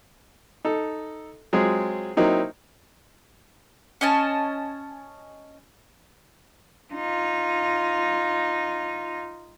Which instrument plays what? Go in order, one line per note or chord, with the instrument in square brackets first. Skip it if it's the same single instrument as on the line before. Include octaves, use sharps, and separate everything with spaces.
[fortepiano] D#4 A4
F#3 G#3 C4 F4 G#4
F#3 A#3 C4 D#4 E4
[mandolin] C#4 D#5 G#5 A5
[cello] D#4 F4